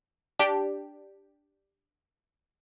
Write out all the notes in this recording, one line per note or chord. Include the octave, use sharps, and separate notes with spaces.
D4 G4